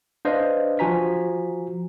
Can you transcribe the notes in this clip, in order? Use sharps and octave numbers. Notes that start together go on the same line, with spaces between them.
D4 B4 C5 D5 D#5 F5
F3 F#4 G#5 A#5 B6